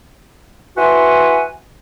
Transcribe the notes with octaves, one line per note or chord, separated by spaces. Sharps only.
E4 F#4 B4 C5 F#5 G#5